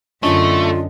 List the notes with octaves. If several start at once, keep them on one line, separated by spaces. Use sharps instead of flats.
F#2 D3 A3 C#4 D4 F4 D#5